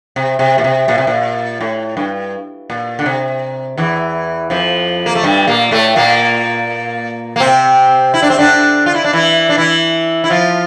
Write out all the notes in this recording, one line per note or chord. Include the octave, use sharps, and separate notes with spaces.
C3
C3
A#2
C3
A#2
C3
A#2
A2
G2
A#2
D3
C3
E2 E3
F2 F3
A#3
A3
G2 G3
A#2 A#3
A2 A3
A#2 A#3
A#3
C3 C4
E4
D4
C4
D3 D4
F4
E4
D4
E3 E4
D4
E3 E4
E4
F3 F4